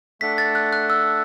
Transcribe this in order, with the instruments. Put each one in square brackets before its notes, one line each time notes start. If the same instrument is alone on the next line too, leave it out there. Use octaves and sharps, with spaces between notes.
[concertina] A3 D4 A4 F#5 [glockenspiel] B6
[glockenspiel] A6
F#6
F#6
E6